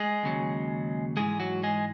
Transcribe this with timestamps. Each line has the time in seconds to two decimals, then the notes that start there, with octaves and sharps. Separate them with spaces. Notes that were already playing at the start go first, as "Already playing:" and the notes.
Already playing: G#3 G#4
0.23 D#2 C#3 F#3
1.17 G#2 E3 G#3 G#4
1.40 F#3 F#4
1.63 G#3 G#4